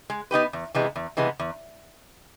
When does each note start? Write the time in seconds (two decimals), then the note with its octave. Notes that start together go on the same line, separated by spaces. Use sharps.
0.10 G#3
0.31 B3 D#4 G4 B4
0.53 E2
0.75 C3 E3 G#3 B3
0.96 E2
1.17 C3 E3 G#3 B3
1.39 E2